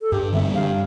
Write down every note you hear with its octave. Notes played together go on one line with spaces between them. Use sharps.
A4
G2 G4
D3 G3 C4 E5
G2 F5